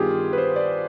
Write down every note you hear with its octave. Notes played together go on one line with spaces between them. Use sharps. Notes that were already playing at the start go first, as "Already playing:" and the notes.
Already playing: G2 D#3 B3 F4 G4 G#4
B4
C5
D5